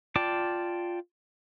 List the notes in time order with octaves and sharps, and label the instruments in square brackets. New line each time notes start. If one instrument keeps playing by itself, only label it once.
[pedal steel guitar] F4 D5 G5 A5 D6